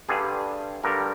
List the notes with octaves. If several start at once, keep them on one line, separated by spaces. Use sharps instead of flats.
G2 D3 G3 G#4
G2 D3 G3 A#4